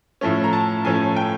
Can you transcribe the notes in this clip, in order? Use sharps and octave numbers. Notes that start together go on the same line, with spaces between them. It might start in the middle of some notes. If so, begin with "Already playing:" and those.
A2 F3 A3 C#4
A#5
A5
A2 F3 A3 C#4 G#5
G5